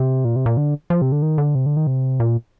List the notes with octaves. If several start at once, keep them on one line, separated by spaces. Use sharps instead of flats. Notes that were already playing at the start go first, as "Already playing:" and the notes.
Already playing: C3
A#2
C3
A#2
D3
F3
C3
D3
D#3
D3
C3
D3
D#3
C3
A#2